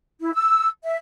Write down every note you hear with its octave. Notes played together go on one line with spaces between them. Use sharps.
E4
E6
E5